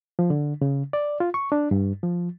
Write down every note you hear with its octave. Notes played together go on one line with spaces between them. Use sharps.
F3
D3
C#3
D5
F4
C#6
D4
G2
F3